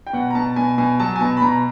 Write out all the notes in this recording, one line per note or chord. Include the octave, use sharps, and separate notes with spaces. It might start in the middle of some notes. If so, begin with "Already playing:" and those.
G5
B2 F#5
A#5
B2 A5
B2 G#5
B2 G#5
F#3 A5
G#5
B2 A5
B5
B2 A#5